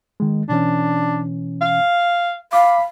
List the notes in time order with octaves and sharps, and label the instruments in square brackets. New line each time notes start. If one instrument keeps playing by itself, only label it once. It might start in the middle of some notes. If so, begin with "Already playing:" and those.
[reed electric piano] D#3 G#3
[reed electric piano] B2 E3 C#4 [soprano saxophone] D4
[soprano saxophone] F5
[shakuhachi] F5 [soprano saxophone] B5 [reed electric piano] D6